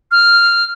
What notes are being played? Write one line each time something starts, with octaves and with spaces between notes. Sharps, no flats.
F6